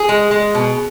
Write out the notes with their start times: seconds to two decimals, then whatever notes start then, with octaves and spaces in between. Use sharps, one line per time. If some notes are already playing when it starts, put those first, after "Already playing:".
Already playing: G#4
0.09 G#3
0.31 G#3
0.54 B2